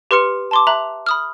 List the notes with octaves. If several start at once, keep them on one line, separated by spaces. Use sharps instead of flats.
G4 B4 C6 F6 C#7
A5 C6 D6
E5 A#5 F#6 F#7
B5 D#6 F6